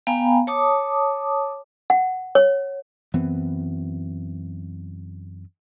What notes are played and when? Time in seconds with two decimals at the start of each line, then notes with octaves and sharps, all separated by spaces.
0.07 B3 F5 G5 G#5 A#5 B5
0.47 C#5 A5 D6 D#6
1.90 F#5
2.35 C#5
3.14 F#2 E3 B3 C4